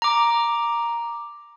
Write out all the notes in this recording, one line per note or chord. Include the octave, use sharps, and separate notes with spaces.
A#5 D6